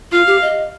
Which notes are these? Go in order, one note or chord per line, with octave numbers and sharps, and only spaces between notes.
F4 F5
G4
D#5